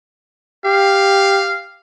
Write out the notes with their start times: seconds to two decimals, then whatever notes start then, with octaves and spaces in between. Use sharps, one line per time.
0.65 G4 F5